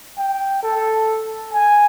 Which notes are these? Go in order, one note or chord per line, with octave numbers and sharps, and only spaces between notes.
G5
A4
G#5